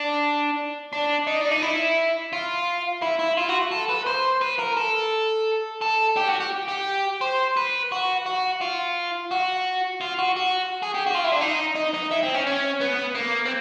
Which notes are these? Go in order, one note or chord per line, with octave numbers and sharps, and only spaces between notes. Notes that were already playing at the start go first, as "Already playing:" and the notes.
Already playing: D4
D4
D#4
D4
D#4
E4
F4
E4
E4
F4
F#4
A4
B4
C5
B4
A#4
A4
A4
G4
F#4
G4
G4
C5
B4
F#4
F#4
F4
F#4
F4
F#4
F#4
G#4
G4
F#4
F4
E4
D4
D#4
D#4
D#4
E4
C4
C#4
C#4
B3
A#3
C4